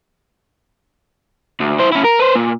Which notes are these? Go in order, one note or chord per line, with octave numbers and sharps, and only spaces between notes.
D2
E4 C5
C#4 E4
A#4
B4 C5
A#2